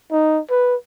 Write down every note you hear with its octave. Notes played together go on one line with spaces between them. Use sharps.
D#4
B4